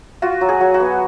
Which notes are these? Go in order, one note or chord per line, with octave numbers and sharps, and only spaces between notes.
F4 F#4
F#3
G#4
F#3
F#4
B3